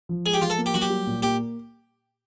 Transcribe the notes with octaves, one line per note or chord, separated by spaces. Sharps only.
F3
G#3 G#4
G4
F3 F4
A4
A#3
G4
F#3 F#4
G4
G3
A#2
A#3 G4